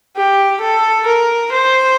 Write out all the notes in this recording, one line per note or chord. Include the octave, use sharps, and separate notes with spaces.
G4
A4
A#4
C5